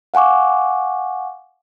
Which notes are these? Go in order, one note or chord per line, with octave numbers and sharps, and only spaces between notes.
F5 F#5 G#5 C#6 D6